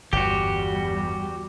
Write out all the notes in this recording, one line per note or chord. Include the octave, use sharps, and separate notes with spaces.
G1 E2 G3 F#4 G4